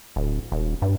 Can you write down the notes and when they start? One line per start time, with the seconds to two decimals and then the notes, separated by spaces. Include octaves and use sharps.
0.16 D1
0.52 D#1
0.82 G2